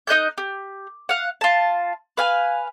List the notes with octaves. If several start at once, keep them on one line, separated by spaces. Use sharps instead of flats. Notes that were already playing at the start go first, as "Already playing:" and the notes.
D#4 D#5 F#6 G6
G4
F5 F#5
F4 A5
B4 F5 G#5